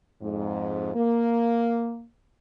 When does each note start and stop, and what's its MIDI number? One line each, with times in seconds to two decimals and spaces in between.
0.22 0.94 41
0.22 0.94 44
0.95 2.04 58